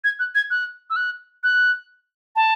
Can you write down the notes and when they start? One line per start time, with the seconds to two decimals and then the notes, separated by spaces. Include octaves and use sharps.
0.04 G#6
0.19 F#6
0.35 G#6
0.50 F#6
0.90 E6
0.96 F#6
1.44 F#6
2.36 A5